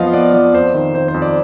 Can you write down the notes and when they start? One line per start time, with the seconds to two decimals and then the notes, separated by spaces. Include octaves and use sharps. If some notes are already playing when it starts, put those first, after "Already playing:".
Already playing: F2 F3 B3 D#5 F5
0.14 B3 D5
0.34 F3 D5
0.53 F2 C5
0.74 D#3
0.94 D#3 C5
1.08 C5
1.14 F2
1.22 D5